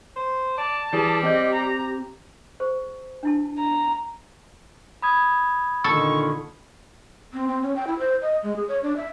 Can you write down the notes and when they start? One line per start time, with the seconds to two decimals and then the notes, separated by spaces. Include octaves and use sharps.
0.16 C5
0.58 D5 A5
0.93 E3 G3 E4 G4 G#4
1.23 C4 D#5 G6
1.53 A#5
2.60 G#4 C5
3.23 D4 E4 A5
3.59 A#5
5.02 B5 D#6 G#6
5.84 A#2 D3 D#3 A4 C#6
7.33 C4
7.48 C4
7.63 C#4
7.76 G5
7.87 E4
7.99 C5
8.21 D#5
8.43 G#3
8.56 G#4
8.68 C#5
8.83 D4
8.97 E5